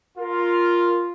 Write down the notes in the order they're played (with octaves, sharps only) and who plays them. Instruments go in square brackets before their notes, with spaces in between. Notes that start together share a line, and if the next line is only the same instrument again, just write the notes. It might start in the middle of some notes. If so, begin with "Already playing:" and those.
[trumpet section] F4 [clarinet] A#4